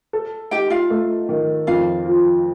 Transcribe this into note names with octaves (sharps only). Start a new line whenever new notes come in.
A4
D#4 G4 G5
F4 F5
A3
D#3
F2 F4 F5
F3